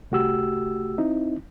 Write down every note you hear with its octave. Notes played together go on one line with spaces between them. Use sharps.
C2 A3 F#4 G4 E6
C4 D#4 E4